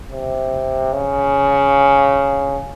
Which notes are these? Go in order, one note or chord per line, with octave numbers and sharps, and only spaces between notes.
C3
C#3